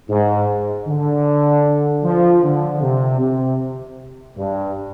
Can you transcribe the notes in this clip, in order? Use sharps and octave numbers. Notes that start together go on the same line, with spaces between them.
G#2
D3
F3
D3
C3
C3
G2